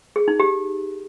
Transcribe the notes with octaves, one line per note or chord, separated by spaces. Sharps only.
G#4
D#4
G4